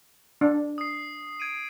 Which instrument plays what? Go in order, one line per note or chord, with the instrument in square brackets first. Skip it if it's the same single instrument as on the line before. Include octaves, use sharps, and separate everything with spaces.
[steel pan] D4
[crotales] D#6 C7
G#6 D7 D#7